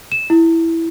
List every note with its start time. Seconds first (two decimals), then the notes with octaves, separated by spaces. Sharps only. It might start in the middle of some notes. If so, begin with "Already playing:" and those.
0.12 E7
0.30 E4